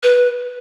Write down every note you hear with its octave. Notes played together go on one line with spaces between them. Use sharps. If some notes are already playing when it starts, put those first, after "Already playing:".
B4